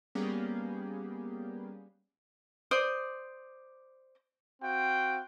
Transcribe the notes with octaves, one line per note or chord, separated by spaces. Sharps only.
G3 A#3 B3 C#4 G4 G#4
C5 D5 D#6
C4 F#4 F5 G5